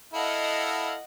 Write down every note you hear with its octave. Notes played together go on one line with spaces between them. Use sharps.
E4 A4 D#5 F5 F#5